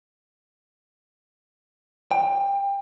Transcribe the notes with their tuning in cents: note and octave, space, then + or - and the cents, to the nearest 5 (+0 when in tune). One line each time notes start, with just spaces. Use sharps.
G5 +20